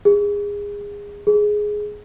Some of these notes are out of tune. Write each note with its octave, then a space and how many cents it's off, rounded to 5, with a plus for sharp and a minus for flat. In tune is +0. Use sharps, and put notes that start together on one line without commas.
G#4 -25
G#4 +5